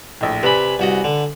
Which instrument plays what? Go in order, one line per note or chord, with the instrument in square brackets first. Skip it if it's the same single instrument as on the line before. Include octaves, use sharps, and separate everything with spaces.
[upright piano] A#1 A2
[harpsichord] C3 B5 [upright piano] B4 D5 G#5
[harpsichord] C2 F#4 D#5
D3